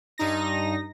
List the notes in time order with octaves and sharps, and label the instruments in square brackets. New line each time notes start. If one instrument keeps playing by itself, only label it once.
[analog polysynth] G2 D#4 A#6